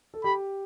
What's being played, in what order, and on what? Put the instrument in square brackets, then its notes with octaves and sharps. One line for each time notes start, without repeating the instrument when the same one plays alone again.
[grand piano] A4
[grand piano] G4 [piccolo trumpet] B5